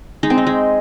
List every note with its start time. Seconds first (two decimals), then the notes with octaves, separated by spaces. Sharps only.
0.23 G#3 D#4
0.30 C4
0.38 D#4
0.47 G#3